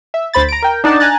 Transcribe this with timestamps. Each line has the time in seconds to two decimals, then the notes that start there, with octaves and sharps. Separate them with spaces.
0.14 E5
0.33 D2 C5 B5 A6
0.49 A#5 D7
0.62 A#4 G5
0.84 D4 D#4 D5 F#5 A5
1.00 G#5 A#5 F#6 A6